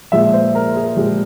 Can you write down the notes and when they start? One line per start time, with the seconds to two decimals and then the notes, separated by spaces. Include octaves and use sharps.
0.12 A#2 F3 G#3 E5
0.33 C5
0.55 A#4
0.76 G#4
0.96 A#2 F3 G#3 G4